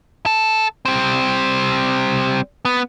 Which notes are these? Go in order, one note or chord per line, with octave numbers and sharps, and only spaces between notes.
A4
G3 C4
B3